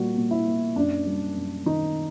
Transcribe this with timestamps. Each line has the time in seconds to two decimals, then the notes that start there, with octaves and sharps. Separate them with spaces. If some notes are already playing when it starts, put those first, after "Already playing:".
Already playing: A#2 G3 A#3 F#4
0.17 A#2
0.31 E4
0.47 A#3
0.76 F#2 D4
1.07 G3
1.37 F#2
1.66 D#3 D#4